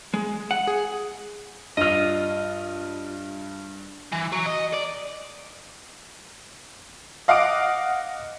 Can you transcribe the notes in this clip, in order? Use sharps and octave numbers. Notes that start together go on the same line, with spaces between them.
G#3
F#5
G#4
G2 F4 D#5 F6
E3
F#3
D#5
D5
D#5 F5 F#5 D6 D#6 D7